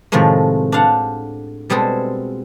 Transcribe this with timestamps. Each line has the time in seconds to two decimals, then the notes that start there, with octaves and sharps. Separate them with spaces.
0.12 A2 C3 D#3 F3 G#3 A3
0.72 D4 C5 F5 F#5
1.70 B2 G3 G#3 C4 G#4 A4